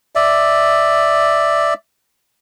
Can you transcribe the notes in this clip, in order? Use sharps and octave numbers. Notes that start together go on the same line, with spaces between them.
D5 E5